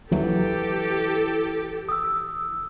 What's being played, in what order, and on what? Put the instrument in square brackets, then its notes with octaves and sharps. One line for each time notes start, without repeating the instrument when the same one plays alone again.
[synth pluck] D#2 F#3 [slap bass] E3 [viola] G4 A4
[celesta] D#6 E6